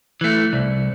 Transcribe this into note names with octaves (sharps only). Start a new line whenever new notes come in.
E3 A3
C2